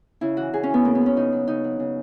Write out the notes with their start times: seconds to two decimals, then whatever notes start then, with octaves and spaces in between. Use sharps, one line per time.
0.21 C#3 E4
0.37 E3 F#4
0.53 C#3 G#4
0.63 C#4
0.69 E3 B3
0.85 C#3 A#3
0.95 B3
1.01 F#3
1.06 C#4
1.16 C#3 D#4
1.32 F#3
1.48 C#3 D#4
1.64 F#3
1.80 C#3